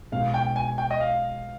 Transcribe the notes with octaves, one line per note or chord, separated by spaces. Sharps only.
B1 B2 G#3 F5
G5
G#5
G5
D#5
F5